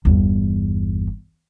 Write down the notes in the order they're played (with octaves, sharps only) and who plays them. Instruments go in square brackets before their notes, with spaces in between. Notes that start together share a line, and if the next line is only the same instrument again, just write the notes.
[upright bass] G1 E2